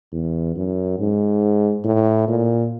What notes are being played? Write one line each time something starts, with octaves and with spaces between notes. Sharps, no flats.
E2
F#2
G#2
A2
A#2